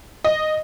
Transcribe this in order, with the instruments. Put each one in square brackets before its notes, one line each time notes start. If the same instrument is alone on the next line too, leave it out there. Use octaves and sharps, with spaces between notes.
[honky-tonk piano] D#5